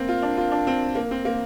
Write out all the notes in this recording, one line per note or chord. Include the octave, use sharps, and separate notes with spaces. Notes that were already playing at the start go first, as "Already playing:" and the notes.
Already playing: A#3 C4
F4
D4
F4
D4
C4
A#3
C4
A#3